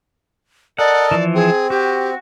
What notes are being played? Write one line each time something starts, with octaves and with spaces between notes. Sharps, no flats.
A4 A#4 D5 D#5 F#5
E3 F3
C4 G#4
F#4 G4